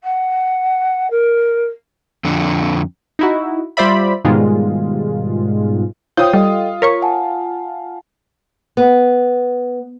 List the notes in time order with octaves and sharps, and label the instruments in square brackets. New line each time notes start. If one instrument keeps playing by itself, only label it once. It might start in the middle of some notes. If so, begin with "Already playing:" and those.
[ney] F#5
A#4
[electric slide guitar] F2 D3
[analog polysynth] D#4 E4 F#4
G3 F4 C5 D5 E5 B5
G#2 B2 D#3 G3 G#3 F4
[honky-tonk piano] F4 D#6 [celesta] C5 C#5 G5 [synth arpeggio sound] G6
[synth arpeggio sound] G3 [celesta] A4 D#5 G5
[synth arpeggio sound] A#4 C#5 C#6 [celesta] B6
[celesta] F#5 G#5 A5
[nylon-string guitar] B3